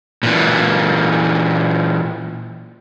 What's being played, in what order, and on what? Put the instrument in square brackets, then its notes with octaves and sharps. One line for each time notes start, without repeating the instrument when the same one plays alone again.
[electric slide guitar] A#2 E3